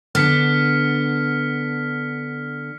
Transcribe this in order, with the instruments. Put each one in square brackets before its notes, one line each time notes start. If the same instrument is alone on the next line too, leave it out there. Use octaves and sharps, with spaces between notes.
[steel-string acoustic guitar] D3 B3 D4 [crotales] F6 B6 C#7